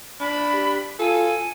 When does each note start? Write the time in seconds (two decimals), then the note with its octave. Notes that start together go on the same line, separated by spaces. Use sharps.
0.20 D4 B5
0.54 G4
0.99 F4 A4 G#5